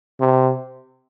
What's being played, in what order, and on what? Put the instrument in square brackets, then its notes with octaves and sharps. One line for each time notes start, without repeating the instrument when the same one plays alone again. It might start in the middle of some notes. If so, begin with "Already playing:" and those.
[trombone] C3